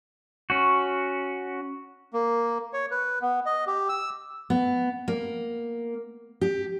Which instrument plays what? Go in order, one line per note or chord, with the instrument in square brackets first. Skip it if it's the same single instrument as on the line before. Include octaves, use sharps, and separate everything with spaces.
[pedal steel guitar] C#4 F#4
[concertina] A#3
C#5
B4
B3
D#5
G4
E6
[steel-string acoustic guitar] B3
A#3
G4